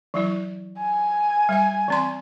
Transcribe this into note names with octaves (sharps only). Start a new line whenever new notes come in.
E3 F#3 E4
G#5
G3 E5
E3 C4 C6